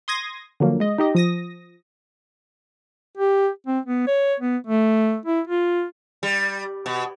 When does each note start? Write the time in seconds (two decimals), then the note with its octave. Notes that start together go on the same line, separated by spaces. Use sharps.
0.08 C6 D#6 G#6 A#6
0.60 D3 F3 F#3 A#3
0.80 G#3 D#5
0.98 D#4 G4 D#5
1.15 F3 D#6 A#6
3.17 G4
3.66 C4
3.86 B3
4.07 C#5
4.40 B3
4.67 A3
5.26 E4
5.47 F4
6.23 G3
6.86 B2